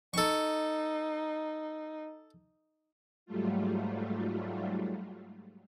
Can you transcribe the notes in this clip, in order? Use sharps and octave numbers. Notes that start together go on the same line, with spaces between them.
D#4 A4 C#6
G#2 F#3 G3 A3 F4